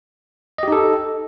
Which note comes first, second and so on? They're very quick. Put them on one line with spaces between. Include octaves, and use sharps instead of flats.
D#5 G4 D#4 A4